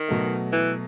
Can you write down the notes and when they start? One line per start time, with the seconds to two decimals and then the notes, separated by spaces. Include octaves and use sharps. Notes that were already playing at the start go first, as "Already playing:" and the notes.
Already playing: D#3
0.08 B2 F#3 A3
0.52 E3